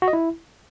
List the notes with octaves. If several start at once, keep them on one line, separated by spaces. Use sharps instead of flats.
F#4
D#5
E4